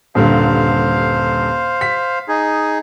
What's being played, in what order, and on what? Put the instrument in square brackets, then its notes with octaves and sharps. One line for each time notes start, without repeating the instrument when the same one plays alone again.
[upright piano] D#1 G2 D3 [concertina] C5 F5
[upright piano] B6
[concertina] D#4 G#4